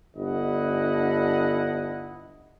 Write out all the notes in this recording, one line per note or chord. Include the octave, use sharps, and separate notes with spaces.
G1 D4 E4 D#5 F#5